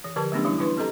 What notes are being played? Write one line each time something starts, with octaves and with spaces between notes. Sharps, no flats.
E3
D3 F3 G4 A#4 A5
F#3 A3 B3 C#4 D4 G4
E3 G3 D4 E4
E3 D4 E4 B4 C6
C4 G4 A4 D#5 A#5